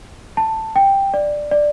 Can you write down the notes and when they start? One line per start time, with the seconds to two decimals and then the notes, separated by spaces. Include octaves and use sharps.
0.37 A5
0.76 G5
1.14 D5
1.51 D5